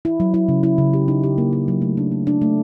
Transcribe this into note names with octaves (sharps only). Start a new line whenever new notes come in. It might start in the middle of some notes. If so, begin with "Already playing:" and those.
E4
F#3
E4
C#3
E4
C#3
G4
D#4
G4
A#3
G4
F#3
A3
D4
A3
D4
A3